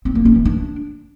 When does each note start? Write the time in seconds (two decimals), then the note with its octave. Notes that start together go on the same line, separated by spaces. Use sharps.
0.05 C4
0.15 A#3
0.25 C#4
0.35 E3
0.45 D4